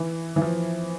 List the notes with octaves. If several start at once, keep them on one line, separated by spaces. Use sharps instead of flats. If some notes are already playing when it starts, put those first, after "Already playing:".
Already playing: E3
E3
F3